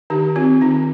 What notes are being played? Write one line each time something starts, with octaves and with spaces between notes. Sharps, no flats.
D#3 D#4 G4
C4 F4
D#3 D#4